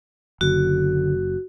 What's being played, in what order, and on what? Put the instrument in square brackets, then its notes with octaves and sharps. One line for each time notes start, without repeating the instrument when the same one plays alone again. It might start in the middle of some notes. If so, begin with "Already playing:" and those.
[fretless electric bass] F#1 [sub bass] D3 [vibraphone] F#4